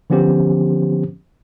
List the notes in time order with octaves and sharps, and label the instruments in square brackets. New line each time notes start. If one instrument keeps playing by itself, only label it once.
[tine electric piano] D3 F3 B3 C#4 G4 C5